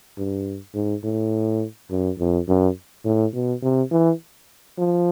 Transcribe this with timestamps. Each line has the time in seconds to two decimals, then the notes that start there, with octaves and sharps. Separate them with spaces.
0.17 G2
0.75 G#2
1.04 A2
1.91 F#2
2.19 F2
2.48 F#2
3.05 A2
3.34 B2
3.62 C3
3.91 E3
4.78 F3